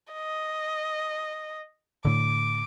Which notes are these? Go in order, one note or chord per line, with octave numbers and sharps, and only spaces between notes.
D#5
A2 D3 D6